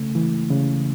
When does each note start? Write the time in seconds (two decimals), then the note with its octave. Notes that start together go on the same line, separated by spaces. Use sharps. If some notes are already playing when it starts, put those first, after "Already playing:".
Already playing: C#3 A3
0.15 E3
0.51 C#3